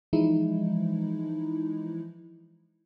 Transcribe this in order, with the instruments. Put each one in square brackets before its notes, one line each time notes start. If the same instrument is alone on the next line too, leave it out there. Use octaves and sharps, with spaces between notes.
[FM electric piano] E3 F3 G#3 D#4 E4